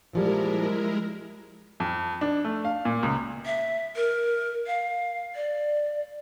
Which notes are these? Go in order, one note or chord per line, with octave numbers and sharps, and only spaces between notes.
A#2 F3 G3 G#3 E4 A#4
F2
D4
A3
F5
A#2
C#2
E5
A#4
F5
D5